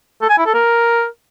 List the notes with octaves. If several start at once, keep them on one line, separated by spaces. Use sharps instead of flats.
A4
G#5
E4
A4
A#4